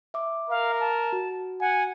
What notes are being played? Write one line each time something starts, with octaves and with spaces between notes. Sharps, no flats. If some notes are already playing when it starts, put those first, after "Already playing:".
E5 D6
A#4 F5
A5
F#4
F#5 G#5